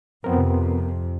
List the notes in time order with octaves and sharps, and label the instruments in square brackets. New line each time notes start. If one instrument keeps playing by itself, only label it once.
[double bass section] F2 C3 [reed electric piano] B3 C4 A#4